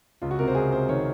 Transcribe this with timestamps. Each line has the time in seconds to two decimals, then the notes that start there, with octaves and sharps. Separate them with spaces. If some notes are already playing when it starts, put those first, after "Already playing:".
0.22 C#2 F4
0.31 F#4
0.39 C3 A#4
0.48 C5
0.55 C#2 G#4
0.72 C3 C5
0.89 D#3 C#5